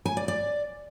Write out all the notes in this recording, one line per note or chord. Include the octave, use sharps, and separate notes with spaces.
G#5
D5
D5